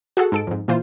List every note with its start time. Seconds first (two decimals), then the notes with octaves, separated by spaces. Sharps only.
0.17 F#4 G#4 A4 F#5
0.32 G#2 A4 D7
0.47 F2 G#2
0.68 A#2 E3 F4 C5